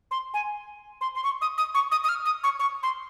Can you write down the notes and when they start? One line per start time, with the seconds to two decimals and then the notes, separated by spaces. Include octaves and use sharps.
0.11 C6
0.34 G#5
1.01 C6
1.15 C6
1.24 C#6
1.42 D#6
1.58 D#6
1.74 C#6
1.91 D#6
2.04 D#6
2.09 F6
2.25 D#6
2.44 C#6
2.59 C#6
2.83 C6